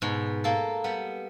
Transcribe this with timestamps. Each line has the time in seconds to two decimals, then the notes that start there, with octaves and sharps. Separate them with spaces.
0.02 G#2 B2
0.44 A#3 A4
0.84 G3 B3